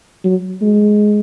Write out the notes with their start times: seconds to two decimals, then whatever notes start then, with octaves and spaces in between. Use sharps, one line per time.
0.24 F#3
0.62 G#3